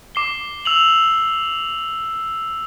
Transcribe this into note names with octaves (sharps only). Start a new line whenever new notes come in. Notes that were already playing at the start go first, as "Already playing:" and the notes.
D6 C7 G7
E6 F7 F#7